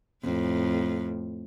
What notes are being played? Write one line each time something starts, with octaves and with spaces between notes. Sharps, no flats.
F2 A2